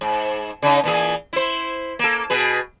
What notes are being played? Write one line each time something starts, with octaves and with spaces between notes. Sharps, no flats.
G#2
C#3 D#4
A#2 E3 G#4
E4 C5
A#3 A4
B2 G#4 B4